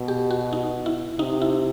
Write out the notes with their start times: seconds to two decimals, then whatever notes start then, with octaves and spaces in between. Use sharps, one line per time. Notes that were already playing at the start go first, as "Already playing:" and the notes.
Already playing: B2
0.08 G4
0.31 F#4
0.53 D#4
0.86 E4
1.19 C3 D#4
1.42 E4